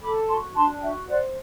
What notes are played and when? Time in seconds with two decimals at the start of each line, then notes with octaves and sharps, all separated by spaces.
0.01 A4 B5 D6
0.28 F#4 A5 C6
0.55 D4 A5 C6
0.81 F#4 E5 G5
1.08 C5 D5 F#5